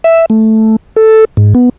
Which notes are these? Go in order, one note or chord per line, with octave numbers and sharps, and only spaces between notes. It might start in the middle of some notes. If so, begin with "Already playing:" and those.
E5
A3
A4
G#2
B3